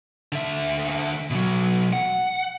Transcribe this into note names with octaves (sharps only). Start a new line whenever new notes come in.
D3 E5
B2 F#3
F#5